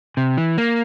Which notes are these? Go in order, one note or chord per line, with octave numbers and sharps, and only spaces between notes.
C3
E3
A#3